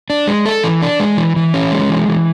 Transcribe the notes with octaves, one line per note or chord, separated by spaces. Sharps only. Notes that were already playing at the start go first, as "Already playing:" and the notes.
D4
G#3
A4
E3
D4
G#3
E3
E3
C#4
G#3
E3
E3